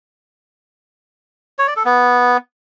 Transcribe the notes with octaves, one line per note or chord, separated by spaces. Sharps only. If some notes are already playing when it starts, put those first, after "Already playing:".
C#5
D5
A4
B3